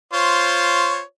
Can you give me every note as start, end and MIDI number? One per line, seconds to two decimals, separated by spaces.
0.13 1.02 65
0.13 1.02 72
0.13 1.02 73